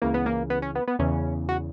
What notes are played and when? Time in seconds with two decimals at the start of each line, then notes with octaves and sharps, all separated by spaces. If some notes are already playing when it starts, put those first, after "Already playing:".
0.02 C#2 C#3 E3 A#3
0.14 B3
0.26 A#3
0.50 B3
0.62 C#4
0.75 B3
0.88 B3
0.99 E2 C#3 E3 C#4
1.49 F#4